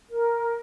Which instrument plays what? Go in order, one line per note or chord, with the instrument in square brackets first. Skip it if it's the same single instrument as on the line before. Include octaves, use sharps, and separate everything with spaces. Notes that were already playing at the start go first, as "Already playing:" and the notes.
[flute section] A#4